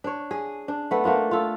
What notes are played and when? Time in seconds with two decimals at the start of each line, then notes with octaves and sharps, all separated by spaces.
0.04 D4 C#5
0.31 G#4
0.68 D4
0.91 A3 B3
1.04 A3 A#3 D4 F4
1.31 F4 A4